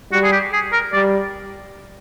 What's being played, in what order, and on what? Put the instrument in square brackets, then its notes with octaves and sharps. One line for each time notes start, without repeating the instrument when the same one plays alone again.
[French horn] G3 [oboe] F#4
[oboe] G#4
G4
G#4
A#4
[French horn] G3 [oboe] D5